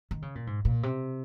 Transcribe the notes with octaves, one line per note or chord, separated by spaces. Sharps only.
D#3
C#3
A#2
G#2
A#2
C3